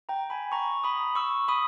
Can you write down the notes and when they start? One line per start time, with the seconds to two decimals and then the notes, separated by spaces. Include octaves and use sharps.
0.09 G5 A#5
0.30 G#5 B5
0.52 A#5 C#6
0.84 B5 D#6
1.15 C#6 E6
1.48 B5 D#6